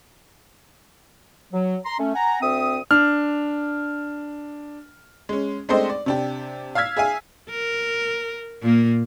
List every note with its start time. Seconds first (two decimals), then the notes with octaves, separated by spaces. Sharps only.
1.53 F#3
1.86 A#5 C6
1.99 A3 C#4
2.15 F#5 G#5 A#5
2.42 D2 C4 E5 D#6
2.91 D4 F6
5.29 G#3 C#4
5.69 G#3 A3 C4 D4 C5 D#5
5.90 D5
6.06 C3 D4 G4
6.75 F5 E6 F6 G#6 B6
6.97 G#4 E5 F5 G#5
7.49 A#4
8.62 A#2 A#3